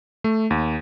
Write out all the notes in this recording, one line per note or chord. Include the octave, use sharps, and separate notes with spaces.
A3
D#2